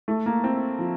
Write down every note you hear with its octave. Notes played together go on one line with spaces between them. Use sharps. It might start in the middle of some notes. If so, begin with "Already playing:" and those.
A3
A#3
C4
F3